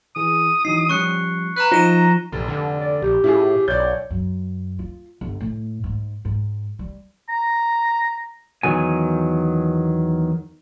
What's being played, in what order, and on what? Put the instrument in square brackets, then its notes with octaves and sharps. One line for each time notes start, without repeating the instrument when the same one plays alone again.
[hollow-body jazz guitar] E3 G#4 [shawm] D#6
[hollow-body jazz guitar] E3 F#3 D#4 [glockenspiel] C7
[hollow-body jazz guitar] F3 G3 C#4 [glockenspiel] C#6 F#6 C#7
[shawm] B4 [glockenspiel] A#5 F#6
[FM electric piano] F3 [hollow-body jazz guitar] D#4 [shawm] A#5 [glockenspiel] D#7 E7 G7
[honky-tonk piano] F1 [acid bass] A#1
[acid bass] D3
[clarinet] D5
[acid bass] A#1 [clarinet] G4
[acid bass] A2 [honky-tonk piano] E4 F4 G#4
[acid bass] B1 [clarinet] C#5 [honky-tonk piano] D5 G6
[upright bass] F#2
F4
G1
A2
G#2
G#2
G3
[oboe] A#5
[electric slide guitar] E2 D#3 F#3 G#5